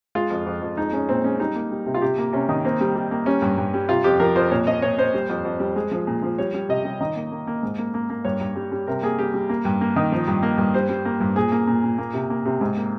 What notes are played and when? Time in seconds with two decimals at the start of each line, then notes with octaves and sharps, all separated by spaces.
0.15 G#3 F4
0.30 F2
0.46 F2
0.62 F2
0.77 G#3 D#4
0.93 G#3 C#4
1.09 A#2 C4
1.24 G#3 C#4
1.40 G3 D#4
1.55 A#3
1.71 G3
1.86 C3
1.94 F4
2.02 C3 G4
2.18 A#3
2.33 C3 C#4
2.49 D#3
2.64 A#3 C4
2.81 G3
2.96 G3
3.11 A#3
3.26 G3 C#4
3.42 G2
3.58 G2
3.74 G3
3.89 C3 F4
4.04 F2 G4
4.20 F3 A#4
4.36 F2 C5
4.51 A#2 C#5
4.67 F3 D#5
4.82 A#2 C#5
4.98 A#2 C5
5.14 G3
5.29 F2
5.45 F2
5.60 G3
5.76 G#3
5.91 F3
6.07 A#2
6.23 F3
6.38 G3 C#5
6.54 G3
6.69 C3 D#5
6.85 G3
7.01 D#3
7.16 A#3
7.32 A#3
7.47 A#3
7.63 G#2
7.78 A#3
7.94 A#3
8.10 A#3
8.25 G2 C#5
8.41 G2
8.56 G3
8.72 G3
8.87 C3 A#4
9.03 A#3 G#4
9.19 G3 G4
9.34 G3
9.49 A#3
9.65 G2
9.81 A#3
9.96 D#3
10.12 F3
10.28 G2
10.43 A#3
10.58 G2
10.74 G3 C5
10.89 G3
11.05 A#3
11.20 G2
11.36 A#2 G#4
11.52 A#3
11.67 A#2
11.84 A#2
11.98 A#3
12.14 C3
12.30 A#3
12.45 C3
12.61 G#2
12.77 A#3